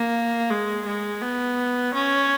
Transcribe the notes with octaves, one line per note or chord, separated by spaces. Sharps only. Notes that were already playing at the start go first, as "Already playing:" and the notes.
Already playing: A#3
G#3
G#3
B3
C#4